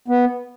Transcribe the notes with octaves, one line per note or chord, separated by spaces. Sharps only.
B3